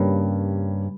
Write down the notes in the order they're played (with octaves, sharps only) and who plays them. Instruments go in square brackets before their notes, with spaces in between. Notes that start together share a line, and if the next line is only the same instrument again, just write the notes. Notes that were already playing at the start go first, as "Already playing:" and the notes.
Already playing: [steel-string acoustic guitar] G2 [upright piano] C#3 G3 A#3 C#4